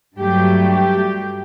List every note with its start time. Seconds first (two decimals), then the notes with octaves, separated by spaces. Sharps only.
0.18 G2 F#3 A3 G4
0.70 G4